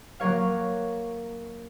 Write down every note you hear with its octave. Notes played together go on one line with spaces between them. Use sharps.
F#3 A#3 A#4 C#5 F5